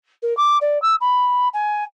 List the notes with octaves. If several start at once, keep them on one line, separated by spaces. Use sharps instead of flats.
A#4
D6
D5
E6
B5
G#5